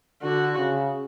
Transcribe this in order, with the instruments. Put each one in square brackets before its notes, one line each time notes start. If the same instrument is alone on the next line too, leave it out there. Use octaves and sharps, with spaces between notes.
[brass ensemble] D3 [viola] F#4
[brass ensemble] C#3